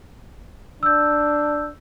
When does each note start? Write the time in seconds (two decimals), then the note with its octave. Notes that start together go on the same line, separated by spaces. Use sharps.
0.83 D4 E6 G6